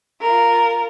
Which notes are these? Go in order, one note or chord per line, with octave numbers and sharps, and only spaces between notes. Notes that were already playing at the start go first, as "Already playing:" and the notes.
F4 A#4